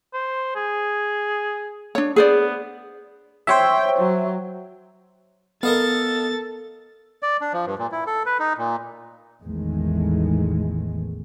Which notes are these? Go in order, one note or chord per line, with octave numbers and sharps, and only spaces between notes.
C5
G#4
D4 C#5
B3 G#4 C5 D5
C5 C#5 E5 G5
F#3
B3 A4 A#4 D#5 F5 A6
D5
D4
F3
G2
A#2
E4
A4
B4
D#4
A#2
A1 E2 D#3 E3 G#3 A3